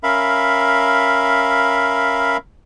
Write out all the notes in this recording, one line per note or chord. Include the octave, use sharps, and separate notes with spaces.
C#4 A#4 E5 F5 B5